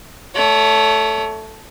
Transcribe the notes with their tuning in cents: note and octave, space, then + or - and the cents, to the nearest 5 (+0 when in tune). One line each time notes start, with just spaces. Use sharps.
A3 +0 C#5 +35